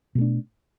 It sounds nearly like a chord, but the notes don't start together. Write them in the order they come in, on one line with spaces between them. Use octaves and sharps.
B2 A3 D4